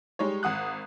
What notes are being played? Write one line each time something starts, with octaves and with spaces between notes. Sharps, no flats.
G3 G#3 D#4 C#5
G#1 F#5 D#6 F#6